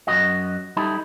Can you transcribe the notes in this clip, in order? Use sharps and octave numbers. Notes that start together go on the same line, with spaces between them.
F#2 C3 F#4 D#5
G3 D#4 E4 A4